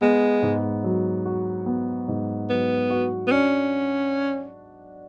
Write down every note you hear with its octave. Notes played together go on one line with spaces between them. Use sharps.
G#3 B3
G#2
F#3
F#4
B3
G#2
F#3 B3
F#4
B3
C#4 D4